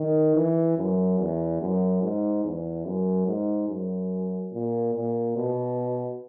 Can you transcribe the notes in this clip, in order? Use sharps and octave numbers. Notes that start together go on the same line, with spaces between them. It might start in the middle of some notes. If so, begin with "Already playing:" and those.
Already playing: D#3
E3
F#2
E2
F#2
G#2
E2
F#2
G#2
F#2
A#2
A#2
B2